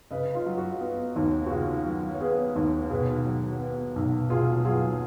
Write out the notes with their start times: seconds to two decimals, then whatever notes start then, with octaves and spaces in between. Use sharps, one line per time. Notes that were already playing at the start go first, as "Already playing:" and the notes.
0.11 C#3 B4 D#5
0.35 F4
0.46 F#3
0.57 F#4
0.81 B3
1.16 D#2
1.46 F#4
1.51 C#3 F4 G#4
1.85 F#3
2.14 C#5
2.20 B3 G#4 B4
2.56 D#2
2.90 B2 G#4 B4
3.25 F#3
3.60 B3
3.96 B1
4.30 B2 F4 G#4
4.65 F#3 F4 G#4